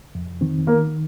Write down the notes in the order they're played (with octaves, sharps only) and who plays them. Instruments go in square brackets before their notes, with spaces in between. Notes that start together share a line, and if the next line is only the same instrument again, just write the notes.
[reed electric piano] F2
D#3 C4
[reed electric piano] D#3 [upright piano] A#3